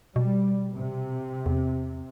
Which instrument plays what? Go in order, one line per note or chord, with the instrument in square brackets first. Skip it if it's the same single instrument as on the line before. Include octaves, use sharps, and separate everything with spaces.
[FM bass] B2 [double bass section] G3
[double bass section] C3
[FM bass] E2